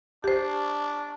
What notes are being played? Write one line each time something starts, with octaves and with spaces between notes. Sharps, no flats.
D4 G4 C5